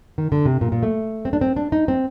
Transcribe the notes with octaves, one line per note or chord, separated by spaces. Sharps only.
D#3
D3
C3
A#2
A#2
A3
C4
D4
C4
D4
D#4
C4